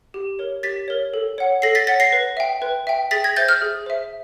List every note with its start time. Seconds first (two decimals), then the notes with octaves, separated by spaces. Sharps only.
0.14 G4
0.39 A#4 C#5
0.63 G4 A6 B6
0.88 A#4 C#5
1.14 A4
1.38 C#5 F#5
1.62 A4 A#6 C7
1.75 A6 B6
1.87 C#5 F#5 A6 B6
2.00 A#6 C7
2.12 B4
2.37 E5 G5
2.62 B4
2.87 E5 G5
3.11 G#4 A6 B6
3.24 G#6 A#6
3.36 C5 E5 G6 A6
3.48 F6 G6
3.62 G#4
3.86 C5 E5